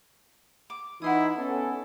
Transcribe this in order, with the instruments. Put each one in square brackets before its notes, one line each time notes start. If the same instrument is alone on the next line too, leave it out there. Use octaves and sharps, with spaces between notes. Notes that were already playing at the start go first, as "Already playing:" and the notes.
[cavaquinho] D6
[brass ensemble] E3 D#4 E4 [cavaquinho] F#5 C6 D#6
[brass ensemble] B3 C#4 A4